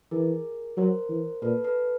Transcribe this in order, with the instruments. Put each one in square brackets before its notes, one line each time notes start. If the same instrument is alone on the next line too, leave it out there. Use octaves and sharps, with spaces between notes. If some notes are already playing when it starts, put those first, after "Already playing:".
[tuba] E3 [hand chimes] G#4 A#4
[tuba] F#3 [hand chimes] A#4 C5
[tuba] E3
[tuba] A#2 [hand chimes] A4 B4
[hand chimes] A4 B4